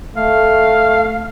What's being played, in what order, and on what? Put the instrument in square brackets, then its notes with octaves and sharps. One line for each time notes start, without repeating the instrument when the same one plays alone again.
[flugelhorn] A3 [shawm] F5